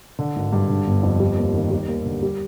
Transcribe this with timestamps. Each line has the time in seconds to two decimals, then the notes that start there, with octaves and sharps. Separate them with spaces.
0.19 D3
0.36 G#1
0.53 G2
0.69 D3
0.87 G1
1.03 F2
1.20 G3
1.37 D#2
1.54 D#3
1.71 G3
1.88 D#2
2.06 D3
2.23 G3